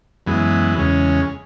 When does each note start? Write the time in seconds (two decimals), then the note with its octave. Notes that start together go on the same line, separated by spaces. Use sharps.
0.27 F#2 E3 G#3 B3
0.75 E2 C#3 G#3 C#4